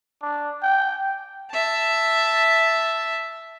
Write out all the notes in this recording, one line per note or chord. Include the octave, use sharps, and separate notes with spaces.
D4
G5
E5 A5